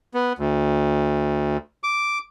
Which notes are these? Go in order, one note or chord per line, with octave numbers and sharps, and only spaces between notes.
B3
D2
D6